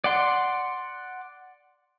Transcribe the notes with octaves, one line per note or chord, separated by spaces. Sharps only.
D5 F#5 C6